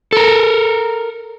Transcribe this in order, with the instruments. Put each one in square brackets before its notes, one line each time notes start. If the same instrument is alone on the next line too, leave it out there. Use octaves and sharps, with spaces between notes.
[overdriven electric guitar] A4 A#4